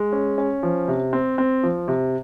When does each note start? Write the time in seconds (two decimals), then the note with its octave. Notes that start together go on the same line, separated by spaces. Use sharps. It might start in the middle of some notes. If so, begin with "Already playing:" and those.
Already playing: G#3
0.13 C#4
0.38 C#4
0.63 F3
0.88 C3
1.13 C4
1.38 C4
1.63 F3
1.88 C3